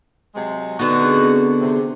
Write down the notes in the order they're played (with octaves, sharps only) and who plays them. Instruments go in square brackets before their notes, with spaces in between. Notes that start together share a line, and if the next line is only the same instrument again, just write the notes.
[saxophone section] C3 F#3 G#3
[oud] D3 B3 [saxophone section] D#4 F#4
[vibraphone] C4 D4 G#4
[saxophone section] C3